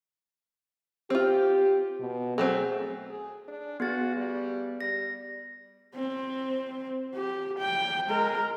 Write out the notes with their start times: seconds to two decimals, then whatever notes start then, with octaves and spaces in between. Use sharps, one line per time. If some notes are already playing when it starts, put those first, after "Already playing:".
1.10 C4 F4 G4
2.00 B2
2.38 F#3 A3 C4 G#4
3.10 G#4
3.48 D4
3.80 B3 F#4 G#4 A6
4.16 G3
4.81 G3 A#6
5.94 C4
7.15 G4
7.58 G5
8.07 G#3 A#4